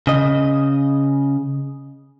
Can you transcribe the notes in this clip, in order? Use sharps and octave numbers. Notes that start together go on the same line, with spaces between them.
C#3 D#5